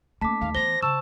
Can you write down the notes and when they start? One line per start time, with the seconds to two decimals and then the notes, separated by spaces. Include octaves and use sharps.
0.21 A3 A#3 C#4 A5 D6 B6
0.41 D#2 D#3 F5
0.55 E3 B3 C5 A#6 G7
0.82 C#3 A5 C#6 E6 E7